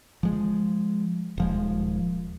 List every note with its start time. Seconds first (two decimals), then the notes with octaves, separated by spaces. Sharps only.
0.23 F3 G#3
1.38 D#1 F3 G#3